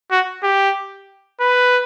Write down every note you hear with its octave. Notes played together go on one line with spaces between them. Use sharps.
F#4
G4
B4